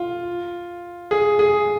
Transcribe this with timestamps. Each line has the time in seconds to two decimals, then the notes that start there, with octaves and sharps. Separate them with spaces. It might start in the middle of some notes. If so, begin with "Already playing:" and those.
Already playing: F4
1.11 G#4
1.39 G#4